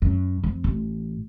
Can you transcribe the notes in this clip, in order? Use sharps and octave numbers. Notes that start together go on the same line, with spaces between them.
F#2
F2
A1